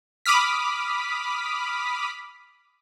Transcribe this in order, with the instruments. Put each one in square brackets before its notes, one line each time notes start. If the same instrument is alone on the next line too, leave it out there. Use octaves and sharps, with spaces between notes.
[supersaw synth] B5 D6 D#6 F6 B6